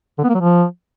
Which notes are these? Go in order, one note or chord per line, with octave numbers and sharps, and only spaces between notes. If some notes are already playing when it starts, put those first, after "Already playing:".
D3
B3
A#3
F#3
F3